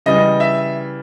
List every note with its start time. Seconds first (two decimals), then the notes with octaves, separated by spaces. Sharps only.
0.06 C#3 E3 G3 D#5
0.40 E5